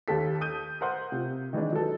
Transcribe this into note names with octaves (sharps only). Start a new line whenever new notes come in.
D#2 G4 A4 B6
D#6 G6 D#7
A#4 C5 F#5 C6 G6
C3 F4
D#3 E3 G#3 D4
F#3 A4